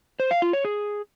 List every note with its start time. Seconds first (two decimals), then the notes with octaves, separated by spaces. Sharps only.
0.20 C5
0.31 F5
0.42 F4
0.53 C#5
0.65 G#4